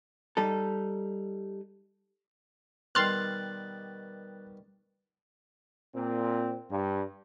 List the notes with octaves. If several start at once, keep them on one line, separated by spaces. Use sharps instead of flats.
G3 D#4 A4
B2 D#3 G3 C6 F6 F#6 A6
A#2 C4
G2